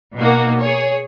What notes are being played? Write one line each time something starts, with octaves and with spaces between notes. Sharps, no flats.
B2 A#3 D#4 F#4
G#4 C#5